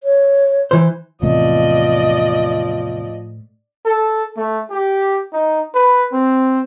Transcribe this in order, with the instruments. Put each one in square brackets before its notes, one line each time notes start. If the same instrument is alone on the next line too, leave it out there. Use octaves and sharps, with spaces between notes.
[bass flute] C#5
[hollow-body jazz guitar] E3 C5
[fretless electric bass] E2 C3 [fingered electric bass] A2 A3 [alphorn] F3 [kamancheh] D5 D#5
[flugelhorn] A4
A3
G4
D#4
B4
C4